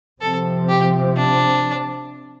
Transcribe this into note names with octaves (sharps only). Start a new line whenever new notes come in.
C3 F3 C4 A4
G4
D4